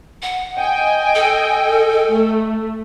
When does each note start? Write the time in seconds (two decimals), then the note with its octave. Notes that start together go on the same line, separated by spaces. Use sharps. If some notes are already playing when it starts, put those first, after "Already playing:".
0.22 F#5
0.56 D#5 G5 G#5
1.15 A4
2.08 A3